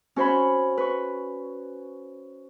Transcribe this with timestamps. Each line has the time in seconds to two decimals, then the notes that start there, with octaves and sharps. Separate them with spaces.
0.16 C#4 F#4 C5 C#5 B5
0.78 B4 C#6